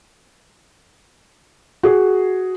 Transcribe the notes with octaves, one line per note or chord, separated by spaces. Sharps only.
F#4 G#4